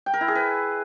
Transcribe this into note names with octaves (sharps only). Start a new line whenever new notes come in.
G5
A#4
E4
G#4
B4